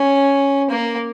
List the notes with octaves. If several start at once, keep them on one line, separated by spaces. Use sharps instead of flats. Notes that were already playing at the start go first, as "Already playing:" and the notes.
Already playing: C#4
A#3